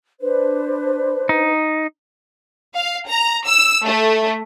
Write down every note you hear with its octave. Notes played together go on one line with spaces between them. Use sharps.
D4 B4 C5
D#4
F5
A#5
E6
A3